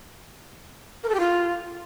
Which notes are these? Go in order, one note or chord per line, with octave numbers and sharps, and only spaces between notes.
A#4
A4
G4
F4